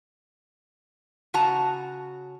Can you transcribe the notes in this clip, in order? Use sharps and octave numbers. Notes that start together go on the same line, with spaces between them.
C#3 F#4 A5 A#5